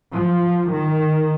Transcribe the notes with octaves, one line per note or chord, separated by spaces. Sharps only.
F3
D#3